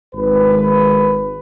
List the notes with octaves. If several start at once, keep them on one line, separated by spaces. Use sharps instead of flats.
G#1 B4